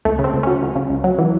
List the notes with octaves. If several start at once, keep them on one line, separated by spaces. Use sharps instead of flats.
C#2 A3
C#3
C4
C#2
F#3 C#4
C#2
C#3
C#2
F#3
E3